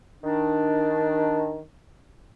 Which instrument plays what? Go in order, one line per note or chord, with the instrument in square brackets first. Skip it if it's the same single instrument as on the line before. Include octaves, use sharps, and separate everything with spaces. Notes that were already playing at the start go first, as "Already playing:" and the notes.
[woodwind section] D#3 D4